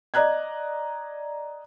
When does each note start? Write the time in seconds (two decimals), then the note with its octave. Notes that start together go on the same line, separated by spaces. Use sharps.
0.14 D5 D#5 A#5 F#6 G#6